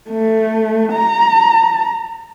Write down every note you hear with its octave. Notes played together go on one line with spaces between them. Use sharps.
A3
A#5